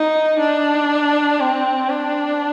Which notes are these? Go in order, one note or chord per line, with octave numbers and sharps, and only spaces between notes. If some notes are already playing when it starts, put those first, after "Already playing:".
Already playing: D#4
D4
C4
D4